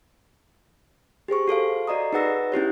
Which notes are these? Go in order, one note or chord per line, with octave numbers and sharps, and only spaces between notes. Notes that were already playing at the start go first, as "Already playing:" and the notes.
G4 G#4 C5 C#6
F#4 A4 C5 F5
F#4 D5 D#5 A#5 D#6
D#4 G#4 B4 F#5 E6 A#6
C#4 E4 G4 C#5